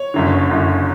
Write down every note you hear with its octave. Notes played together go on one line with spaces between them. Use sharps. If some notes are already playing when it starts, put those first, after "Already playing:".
Already playing: C#5
F#1 F#2 D3
F#1 F#2 D3